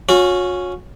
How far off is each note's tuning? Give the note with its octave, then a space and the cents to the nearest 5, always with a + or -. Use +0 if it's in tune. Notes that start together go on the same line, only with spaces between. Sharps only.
C#4 +0 F#4 -40